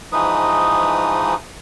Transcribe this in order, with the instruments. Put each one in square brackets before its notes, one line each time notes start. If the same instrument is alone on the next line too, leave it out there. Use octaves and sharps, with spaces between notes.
[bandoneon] G#2 E3 F3 D#4 B4 D#6